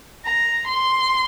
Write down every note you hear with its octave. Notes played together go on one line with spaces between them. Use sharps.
A#5
C6